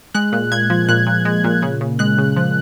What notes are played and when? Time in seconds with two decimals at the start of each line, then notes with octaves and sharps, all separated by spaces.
0.14 G#3 F#6
0.32 A#2
0.52 A#2 G#6
0.70 F3
0.88 A#2 F#6
1.07 A#2
1.25 G#3
1.44 A#2
1.62 C#3
1.81 C#3
1.99 G#3 F#6
2.18 C#3
2.36 F3